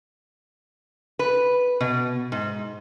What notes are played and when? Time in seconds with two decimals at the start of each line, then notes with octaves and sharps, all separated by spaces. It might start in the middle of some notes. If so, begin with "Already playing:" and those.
1.19 B4
1.81 B2
2.32 G#2